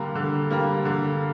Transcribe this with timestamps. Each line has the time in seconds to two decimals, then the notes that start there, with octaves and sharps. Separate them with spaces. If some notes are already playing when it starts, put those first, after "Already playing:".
Already playing: D3 G3 A#3
0.15 D3
0.51 G3 A#3
0.85 D3